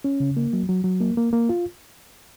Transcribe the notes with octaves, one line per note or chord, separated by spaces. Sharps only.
C#4
C#3
A#3
F#3
F#3
F#3
A#3
A#3
A#3
F4